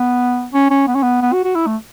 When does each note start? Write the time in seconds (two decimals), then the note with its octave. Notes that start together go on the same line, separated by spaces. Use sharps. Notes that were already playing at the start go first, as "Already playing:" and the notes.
Already playing: B3
0.53 C#4
0.70 C#4
0.87 B3
0.95 C#4
1.03 B3
1.21 B3
1.33 F#4
1.44 F#4
1.55 E4
1.67 A3